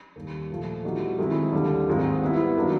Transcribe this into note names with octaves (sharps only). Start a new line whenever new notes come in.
D#2 D#3 G3
A#2 F3 A3
E3 G3 B3 D#4 F#4
D#3 G#3 C4 E4
D#2 D3 G3
G#2 D#3 G#3 C4 F4
G3 B3 E4
D#3 F#3 A#3 D4